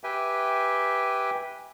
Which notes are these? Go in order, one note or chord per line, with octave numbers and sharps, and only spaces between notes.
G4 B4 E5 G5 G#5